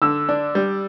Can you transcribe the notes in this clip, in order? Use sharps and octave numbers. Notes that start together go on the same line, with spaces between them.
D3 E6
D4
G3